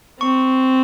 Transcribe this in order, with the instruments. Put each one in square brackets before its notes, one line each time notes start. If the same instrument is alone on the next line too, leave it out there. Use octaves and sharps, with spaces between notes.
[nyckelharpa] C4 [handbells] C#6